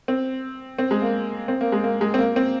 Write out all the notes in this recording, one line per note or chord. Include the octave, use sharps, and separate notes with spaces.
C4
C4
G#3
A#3
C4
A#3
G#3
A#3
G#3
C4
A#3
C4